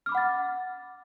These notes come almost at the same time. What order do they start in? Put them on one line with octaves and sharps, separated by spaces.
F6 D6 B5 F#5 A6